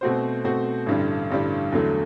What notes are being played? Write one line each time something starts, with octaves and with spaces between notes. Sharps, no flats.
B2 A3 C4 F#4 C5
B2 A3 C4 F#4 C5
A1 G2 D3 G3
A1 G2 D3 G3
E2 D3 F#3 A3